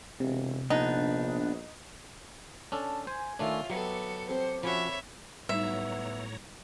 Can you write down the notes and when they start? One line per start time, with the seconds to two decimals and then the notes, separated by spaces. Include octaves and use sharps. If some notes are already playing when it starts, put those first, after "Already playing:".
0.20 E1 C3
0.70 A#1 B3 D4 D#4
2.72 C#4 D4 A4 A5
3.07 C5 G#5
3.39 D#3 A3 D4 F4 C#5 E5
3.70 F#3 B3 G4 A4 C#7
4.29 C4 G4 A4 C5
4.63 F3 C#4 F#4 C#5 E5 B5
5.49 A2 F#3 G3 B3 D#4 C#5 E5 A#5